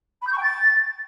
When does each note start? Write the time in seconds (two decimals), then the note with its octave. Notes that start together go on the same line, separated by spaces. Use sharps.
0.21 B5
0.27 G6
0.32 C#6
0.37 G5
0.42 A6